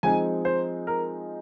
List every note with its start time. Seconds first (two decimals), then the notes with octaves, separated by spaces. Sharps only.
0.03 F3 G#3 C4 D#4 G#5
0.45 C5
0.87 A#4